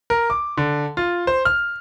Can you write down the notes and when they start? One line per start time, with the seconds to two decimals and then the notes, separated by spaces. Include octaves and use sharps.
0.10 A#4
0.30 D6
0.57 D3
0.97 F4
1.27 C5
1.45 F6